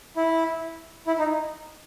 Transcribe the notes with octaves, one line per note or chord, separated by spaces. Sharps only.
E4
E4
D#4